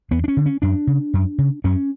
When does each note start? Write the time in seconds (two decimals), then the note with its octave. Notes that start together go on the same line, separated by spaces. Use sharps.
0.11 E2 B3
0.24 D4
0.28 C#4
0.37 D3
0.46 C#4
0.62 F#2 D4
0.87 C#3
1.14 F#2
1.38 C#3
1.64 F#2 C#4